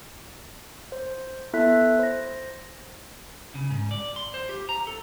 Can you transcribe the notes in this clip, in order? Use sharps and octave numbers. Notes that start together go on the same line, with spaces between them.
C5
B3 E4 A4 E5 F#6 B6
C5 A#6
C#3
G#2
D5
C6
C5
G4
A#5
A4